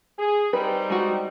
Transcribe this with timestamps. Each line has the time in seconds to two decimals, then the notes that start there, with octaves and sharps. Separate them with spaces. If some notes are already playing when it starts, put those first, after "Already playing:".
0.18 G#4
0.53 G3 C4 D#4 B4
0.90 G#3 F#4